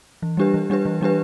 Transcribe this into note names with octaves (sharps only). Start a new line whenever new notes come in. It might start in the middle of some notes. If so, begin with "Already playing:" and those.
E3
G3 D4 G4 B4
E3
G3 D4 G4 B4
E3
G3 D4 G4 B4